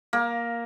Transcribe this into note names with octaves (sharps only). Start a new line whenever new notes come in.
A#3